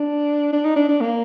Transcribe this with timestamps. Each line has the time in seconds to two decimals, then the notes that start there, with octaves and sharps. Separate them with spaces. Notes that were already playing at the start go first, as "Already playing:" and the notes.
Already playing: D4
0.53 D4
0.65 D#4
0.76 D4
0.89 D4
1.01 A#3